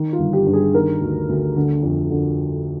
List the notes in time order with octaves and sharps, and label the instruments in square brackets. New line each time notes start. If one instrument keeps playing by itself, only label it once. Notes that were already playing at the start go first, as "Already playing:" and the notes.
Already playing: [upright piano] D#3
F4
G1
G4
G2
G#4
D#3 A#4
D2
D2
D3
F2
D3